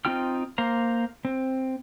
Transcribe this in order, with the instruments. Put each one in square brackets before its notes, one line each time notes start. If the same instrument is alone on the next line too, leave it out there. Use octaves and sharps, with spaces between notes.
[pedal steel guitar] C4 D#4 F4 G5 F6
A#3 C5 F5 A#5
C4